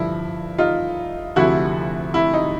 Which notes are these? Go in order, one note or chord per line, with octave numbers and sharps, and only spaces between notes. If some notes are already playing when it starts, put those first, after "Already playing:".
Already playing: G2 D3 F3 E4
D#4 F4
D2 C3 F3 E4 F#4
E4
D#4